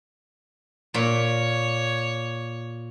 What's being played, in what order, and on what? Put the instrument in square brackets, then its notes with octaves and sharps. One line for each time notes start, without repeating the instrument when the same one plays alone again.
[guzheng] A#2 [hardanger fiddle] C#5